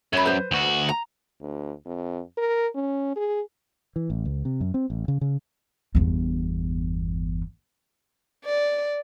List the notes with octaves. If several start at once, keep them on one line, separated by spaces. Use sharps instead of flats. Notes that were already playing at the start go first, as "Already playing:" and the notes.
F#2 C#5 B5
B4 C5
D2 F#4
A#5
D2
F2
A#4
C#4
G#4
E3
A1
C#2
C3
F#2
C4
A1
C#3
C#3
G1 E2
D5